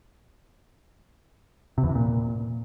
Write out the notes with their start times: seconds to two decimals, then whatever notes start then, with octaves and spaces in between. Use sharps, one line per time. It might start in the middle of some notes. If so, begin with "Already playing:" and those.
1.78 C3
1.83 E2
1.89 C3
1.95 A#2